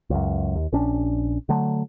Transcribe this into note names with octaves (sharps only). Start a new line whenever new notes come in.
C#2 F#2
D#2
A#1 C#4 D4
D3 F#3 A3